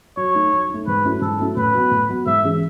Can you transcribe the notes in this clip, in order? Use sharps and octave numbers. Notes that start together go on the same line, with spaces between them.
F#3 C#5
A3 D#4
F#3
A3 D#4
G#2 B4
F#3 A3 C#4 E4
G#2 A4
F#3 A3 C#4 E4
A2 B4
F#3 B3
A2
F#3 B3
G#2 E5
E3 G#3 C#4 G#4